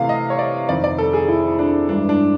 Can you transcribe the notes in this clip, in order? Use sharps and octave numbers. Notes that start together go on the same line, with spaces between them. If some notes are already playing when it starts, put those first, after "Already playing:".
Already playing: C3 E3 A3 F5
D#5
C#5
D5
F2 C3 D#3 D5
D5
A4
G#4
E4
D4
G2 E3 G#3 D4
D4